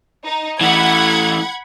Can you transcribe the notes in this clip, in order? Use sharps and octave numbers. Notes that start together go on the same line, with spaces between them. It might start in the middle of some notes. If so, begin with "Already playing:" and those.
D#4
E3 A3 F#5 B5 G#6